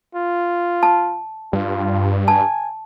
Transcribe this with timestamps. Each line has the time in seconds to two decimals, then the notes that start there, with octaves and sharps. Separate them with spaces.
0.15 F4
0.83 A5
1.53 G2 F4
2.28 G#5 A5